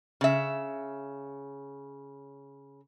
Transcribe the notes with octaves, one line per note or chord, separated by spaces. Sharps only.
C#3 E5